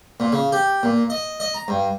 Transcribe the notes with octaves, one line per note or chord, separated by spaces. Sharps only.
A#2
C#3
G4
A#2
D#5
D#5
A#5
G2